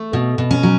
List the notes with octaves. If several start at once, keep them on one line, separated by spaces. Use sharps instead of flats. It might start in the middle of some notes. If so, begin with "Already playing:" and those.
Already playing: A3
B2
B2
C#4
F#3